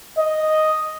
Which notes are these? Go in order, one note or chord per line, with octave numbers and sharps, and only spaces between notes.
D#5